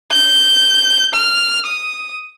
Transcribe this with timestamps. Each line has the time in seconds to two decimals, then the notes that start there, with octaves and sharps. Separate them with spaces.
0.12 G6
1.14 F6
1.66 D#6